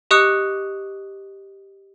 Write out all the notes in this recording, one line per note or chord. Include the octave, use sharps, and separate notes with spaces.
G4 D#5 C#6 D#6 F#6 C#7